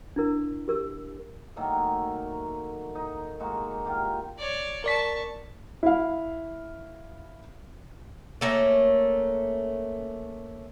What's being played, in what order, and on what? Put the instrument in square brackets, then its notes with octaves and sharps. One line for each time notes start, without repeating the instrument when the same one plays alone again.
[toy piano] D4 E4 A#4
G4 A#4 E6
[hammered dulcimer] D#3 F#3 A3 A#3
D#4
G#3 A#3 D#4 F#4
F4 G4 A#4
[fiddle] C#5 D5
[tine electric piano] A#4 D5 B6 [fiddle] A5 C#6
[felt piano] E4 F5
[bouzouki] A3 A#3 C#4